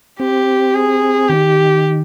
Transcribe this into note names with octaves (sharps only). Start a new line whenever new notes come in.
C4 G4
G#4
D#3 G4